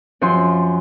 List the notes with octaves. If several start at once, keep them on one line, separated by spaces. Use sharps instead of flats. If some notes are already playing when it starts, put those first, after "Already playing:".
F#2 F3 F#4 C5 C6